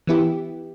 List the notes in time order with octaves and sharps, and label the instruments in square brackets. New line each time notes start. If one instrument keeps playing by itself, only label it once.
[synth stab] E3 B3 E4 G4